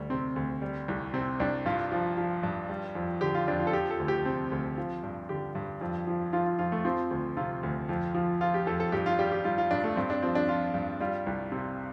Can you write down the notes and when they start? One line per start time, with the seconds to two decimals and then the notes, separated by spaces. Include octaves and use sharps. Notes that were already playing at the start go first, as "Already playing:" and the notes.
Already playing: D2 G3
0.10 C3 C4
0.36 D2
0.62 G3
0.88 C2
1.13 C3 C4
1.40 C2 D4
1.66 G2 F4
1.92 F3
2.18 F3
2.43 G2
2.69 G3
2.95 F2
3.21 D3 G4
3.35 F4
3.48 F2 D4
3.60 F4
3.67 A4
3.73 F3 G4
3.90 A4
4.00 D2
4.08 G4
4.25 C3 C4
4.51 D2
4.77 F3
5.03 G2
5.29 D3 G4
5.55 G2
5.81 F2
6.07 F3
6.33 F3 F4
6.46 F4
6.59 F2 F4
6.72 A3
6.85 F3 C4
7.11 D2
7.37 C3 F4
7.63 D2
7.89 F2
8.15 F3
8.41 F3 F4
8.54 G4
8.67 F2 A4
8.80 A4
8.92 G2 G4
9.06 F4
9.19 G3 G4
9.32 G4
9.45 G3 F4
9.58 F4
9.71 G2 D4
9.84 A3
9.96 G2 C4
10.10 D4
10.22 F3 C4
10.35 D4
10.48 F3 F4
10.74 G2
11.01 G3 F4
11.27 C2
11.52 C3